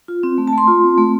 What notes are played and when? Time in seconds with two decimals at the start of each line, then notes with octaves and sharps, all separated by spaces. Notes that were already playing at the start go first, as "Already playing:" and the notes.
0.08 F4
0.23 C4
0.38 A3
0.48 A5
0.53 A3 C6
0.67 F4
0.84 C4
0.98 A3